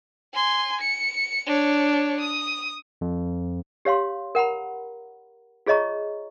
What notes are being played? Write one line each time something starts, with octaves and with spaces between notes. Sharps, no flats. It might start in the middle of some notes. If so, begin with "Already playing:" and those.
G#5 C6
C#7
D4 C#5
D#6
F2
G4 C#5 F5 C6
A#4 F#5 A#5 B5
F4 G#4 C#5 D#5 A#5 C#6